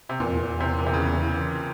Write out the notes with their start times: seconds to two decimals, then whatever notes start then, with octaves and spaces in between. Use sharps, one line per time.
0.09 C3
0.20 E2 A#2
0.28 F2
0.36 E2
0.60 C3
0.79 A#2
0.86 C3
0.93 C#3
1.01 E3